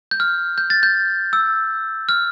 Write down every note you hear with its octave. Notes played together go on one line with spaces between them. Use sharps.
G6
F6
G6
A6
G6
E6
F6